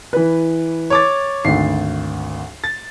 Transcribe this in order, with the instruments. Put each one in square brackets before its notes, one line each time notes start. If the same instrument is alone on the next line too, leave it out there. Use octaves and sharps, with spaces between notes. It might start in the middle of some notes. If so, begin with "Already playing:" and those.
[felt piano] E3 B4
[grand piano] C#5 D6 A6
[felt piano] G#1 D2 [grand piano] C7
[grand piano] A6